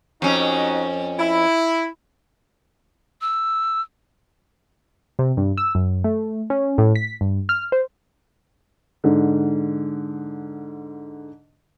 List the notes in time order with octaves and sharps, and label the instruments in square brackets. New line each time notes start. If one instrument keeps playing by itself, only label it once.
[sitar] F2 C#4 [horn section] D#4 F#4
[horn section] E4
[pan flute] E6
[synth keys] C3
G2
E6
F#2
A3
C#4
A2
B6
G2
F6
C5
[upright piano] G#2 D3